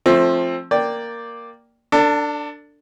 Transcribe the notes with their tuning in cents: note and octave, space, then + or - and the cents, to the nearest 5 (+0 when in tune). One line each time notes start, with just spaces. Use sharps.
F3 +0 A3 +0 C4 +20
A#3 +0 D5 +0 G5 +0
D4 +0 A4 +35